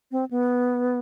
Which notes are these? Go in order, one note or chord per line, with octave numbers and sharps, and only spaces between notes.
C4
B3